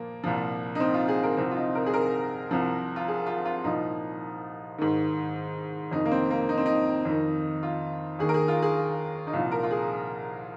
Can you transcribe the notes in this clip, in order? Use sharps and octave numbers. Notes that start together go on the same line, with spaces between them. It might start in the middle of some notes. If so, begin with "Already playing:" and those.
Already playing: A#2 F3 A#3
C2 A#2 F3
D#4
C4
F4
G#4
A#4
C2 C3 F3 C4
F4
D#4
A#4
G#4
A#4
C2 C3 F3
F4
G#4
F4
F4
C2 A#2 F3 D#4
G#2 D#3
F2 C3 D#3 D#4
A#3
C4
A#3
D#4
C4
D#4
F2 D#3
F4
D#2 D#3 G#4
A#4
G#4
F4
G#4
D#4
C2 A#2 F3 F4
A#4
F4
G#4